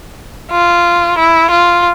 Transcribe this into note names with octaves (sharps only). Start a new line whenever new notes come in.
F4
E4
F4